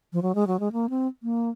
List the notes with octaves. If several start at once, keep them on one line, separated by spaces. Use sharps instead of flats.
F3
F#3
G#3
F#3
G#3
A#3
C4
A#3